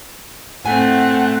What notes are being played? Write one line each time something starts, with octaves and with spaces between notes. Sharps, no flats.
A2 A3 C4 F#5 G#5